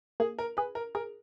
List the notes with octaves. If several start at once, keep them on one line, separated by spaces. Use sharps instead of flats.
A#3 G#4
A#4
G#4 B4
A#4
G#4 A#4